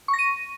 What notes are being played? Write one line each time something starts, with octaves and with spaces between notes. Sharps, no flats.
C#6
A#6
D#7